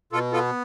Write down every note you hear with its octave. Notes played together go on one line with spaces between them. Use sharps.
B2 F4 A4
B3 F4 A4